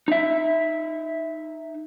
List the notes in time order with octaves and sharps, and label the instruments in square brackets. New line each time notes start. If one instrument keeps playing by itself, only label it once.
[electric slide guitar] D#4 E5